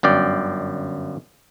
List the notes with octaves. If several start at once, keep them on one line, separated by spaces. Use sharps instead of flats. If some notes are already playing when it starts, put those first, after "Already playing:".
G1 F#2 D5 G5